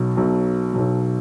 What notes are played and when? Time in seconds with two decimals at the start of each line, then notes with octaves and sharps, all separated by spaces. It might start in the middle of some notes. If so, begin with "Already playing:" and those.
Already playing: B1 B2 F#3
0.17 B1 B2 F#3
0.74 B1 B2 F#3